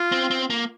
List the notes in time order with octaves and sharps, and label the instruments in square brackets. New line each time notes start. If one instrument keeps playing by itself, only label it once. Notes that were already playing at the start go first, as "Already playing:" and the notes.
Already playing: [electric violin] F4
[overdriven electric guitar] C4
C4
A#3